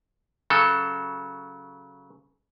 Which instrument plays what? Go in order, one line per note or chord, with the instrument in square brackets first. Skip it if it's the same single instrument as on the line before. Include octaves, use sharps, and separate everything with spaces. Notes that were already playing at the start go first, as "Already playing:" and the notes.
[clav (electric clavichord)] C#3 F#3 A4